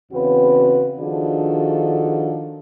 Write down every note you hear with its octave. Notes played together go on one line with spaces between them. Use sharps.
E2 C#3 C4 F#4 B4
D#3 F3 D4 F#4 G#4 A4